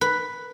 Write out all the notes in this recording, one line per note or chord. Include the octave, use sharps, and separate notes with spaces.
B4